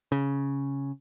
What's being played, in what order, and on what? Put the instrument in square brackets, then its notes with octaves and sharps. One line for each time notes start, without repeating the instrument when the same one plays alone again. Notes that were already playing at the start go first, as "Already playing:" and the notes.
[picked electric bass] C#3